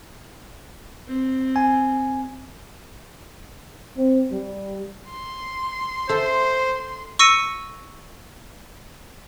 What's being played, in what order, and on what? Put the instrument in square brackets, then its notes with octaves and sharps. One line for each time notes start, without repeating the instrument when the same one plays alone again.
[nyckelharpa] C4
[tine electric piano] G#5
[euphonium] C4
G3
[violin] C6
[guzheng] A4 E5 [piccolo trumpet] C5
[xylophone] C#6 E6 A#6 C#7 D#7